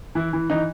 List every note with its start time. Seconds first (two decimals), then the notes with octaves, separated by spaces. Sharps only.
0.15 E3 E4
0.33 E3
0.50 E3 D#4